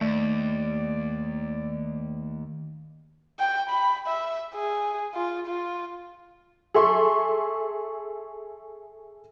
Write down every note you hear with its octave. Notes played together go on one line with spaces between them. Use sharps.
D#2 A3 D5
G5
B5
E5
G#4
F4
F4
G#4 A4 E5 C6 C#6